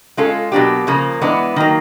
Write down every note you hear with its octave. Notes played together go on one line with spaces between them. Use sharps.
G#3 C#4 F4 A4
B2 F#3 A#3 D4 G4
C#3 F3 A#3
E3 G#3 B3 D4
D#3 F#3 A#3